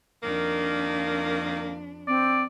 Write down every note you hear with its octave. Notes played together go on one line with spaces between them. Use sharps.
F2 D#3 A#3 D4
C4 D5